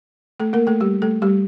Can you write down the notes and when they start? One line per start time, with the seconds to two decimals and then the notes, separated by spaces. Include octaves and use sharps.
0.40 A3 A4
0.53 A#3 A#4
0.67 A3 A4
0.80 G3 G4
1.02 A3 A4
1.22 G3 G4